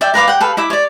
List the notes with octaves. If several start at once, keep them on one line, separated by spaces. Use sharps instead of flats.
D5 E5 G5
A#4 B4 F5 D6
F#5 G5
A4 B4 F5
E4 E5 D6
C#5 D5